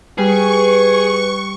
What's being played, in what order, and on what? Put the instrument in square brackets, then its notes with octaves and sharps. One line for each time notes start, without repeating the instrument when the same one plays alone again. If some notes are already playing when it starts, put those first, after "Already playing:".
[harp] G3 [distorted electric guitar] G#4 [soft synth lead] B4 [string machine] C#6